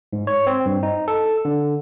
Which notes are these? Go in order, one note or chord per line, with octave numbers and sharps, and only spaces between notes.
G#2
C#5
C4
G2
D#4
A4
D3